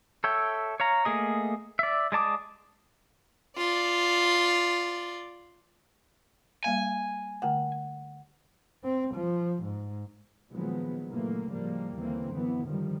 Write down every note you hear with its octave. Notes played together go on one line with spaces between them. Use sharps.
A4 C#5 E5 G5
C#5 F5 A#5
A3 A#3 G#4 D#5
D5 E5
G#3 D5 A5 D6 D#6
F4 D5
G3 A#3 F5 G#5
D3 A3 F#5 G5
C4
F3
G#2
A#2 D#3 F3 F#3 G#3 B3
A#2 C#3 E3 F#3 A3 A#3
A2 F3 G3 G#3 A#3
D#2 D3 E3 A#3 C4
F#2 E3 B3
D3 D#3 F3 G3